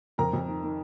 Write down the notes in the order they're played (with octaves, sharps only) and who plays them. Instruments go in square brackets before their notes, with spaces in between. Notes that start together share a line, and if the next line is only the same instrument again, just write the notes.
[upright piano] F2 A#4 A#5
F2
D#3
D#3